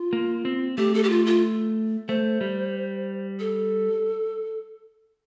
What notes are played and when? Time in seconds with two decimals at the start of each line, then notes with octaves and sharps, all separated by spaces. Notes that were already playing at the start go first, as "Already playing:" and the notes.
Already playing: F4
0.13 A#3
0.45 C4
0.77 A3 G4
0.94 A4
1.03 G4
1.10 F4
1.26 F4
2.08 A3 C5
2.41 G3
3.39 A4